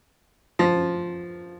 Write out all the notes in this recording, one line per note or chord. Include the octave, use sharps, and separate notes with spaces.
F3